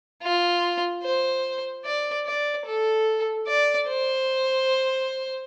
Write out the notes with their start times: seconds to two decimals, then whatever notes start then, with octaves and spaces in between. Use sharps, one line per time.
0.23 F4
1.03 C5
1.85 D5
2.26 D5
2.65 A4
3.47 D5
3.89 C5